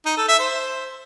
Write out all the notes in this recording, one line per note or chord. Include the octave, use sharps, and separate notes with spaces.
D#4
A4
E5
C5